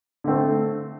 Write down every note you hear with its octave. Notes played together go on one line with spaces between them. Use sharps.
D3 A3 C4